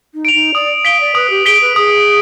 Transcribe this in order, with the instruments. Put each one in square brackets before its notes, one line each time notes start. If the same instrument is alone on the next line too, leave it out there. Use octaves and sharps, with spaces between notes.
[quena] D#4
[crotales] D7 F7
[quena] D#4
[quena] D5 [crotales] D#6
[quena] F5 [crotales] B6 D7 G7
[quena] D5
[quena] B4 [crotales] D#6
[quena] G4
[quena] G#4 [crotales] B6 D7 G7
[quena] B4
[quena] G#4 [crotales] D#6